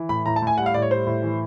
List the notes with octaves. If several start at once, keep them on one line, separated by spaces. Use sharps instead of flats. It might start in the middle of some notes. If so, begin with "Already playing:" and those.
Already playing: E3
A2 B5
A2 A#5
A5
A2 G#5
G3 F#5
F5
A2 D5
C#5
G3 C5
A2
E3